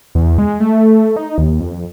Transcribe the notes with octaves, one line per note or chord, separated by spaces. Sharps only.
E2
G#3
A3
D#4
D#2
F2